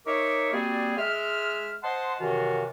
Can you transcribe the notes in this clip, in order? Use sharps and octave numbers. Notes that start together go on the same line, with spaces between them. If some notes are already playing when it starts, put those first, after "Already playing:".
D#4 A#4 C#5 E5 C#6 D6
G3 A#3 C4 F#4 G#4 D5
G#3 E5 F6
C5 D#5 F#5 A5 C6
F#2 C3 D#3 E3 F4 F#4